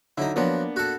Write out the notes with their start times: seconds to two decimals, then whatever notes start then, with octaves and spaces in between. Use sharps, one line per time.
0.17 D3 F#3 D#4 E4
0.36 F3 F#3 A#3 B3 D4
0.76 F#4 A4